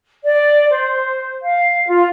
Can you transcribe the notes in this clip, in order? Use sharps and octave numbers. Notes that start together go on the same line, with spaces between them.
D5
C5
F5
F4